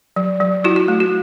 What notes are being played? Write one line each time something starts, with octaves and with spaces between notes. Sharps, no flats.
F#3
F#3
E4 F#4
F#4
A3
F#4